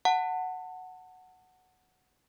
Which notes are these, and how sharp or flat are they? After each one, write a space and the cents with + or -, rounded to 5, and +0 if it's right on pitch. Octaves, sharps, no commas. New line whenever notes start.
F#5 +0 A5 +30